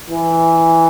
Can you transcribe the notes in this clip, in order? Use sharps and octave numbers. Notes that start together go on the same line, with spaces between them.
E3